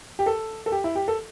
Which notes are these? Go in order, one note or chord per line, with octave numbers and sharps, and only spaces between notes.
G4
A4
A4
G4
E4
G4
A4